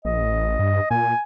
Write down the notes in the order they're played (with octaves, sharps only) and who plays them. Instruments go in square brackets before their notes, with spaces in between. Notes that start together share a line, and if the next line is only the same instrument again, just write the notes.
[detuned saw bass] A#1 [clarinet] D#5
[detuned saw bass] A1
G2
[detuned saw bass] A#2 [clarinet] G#5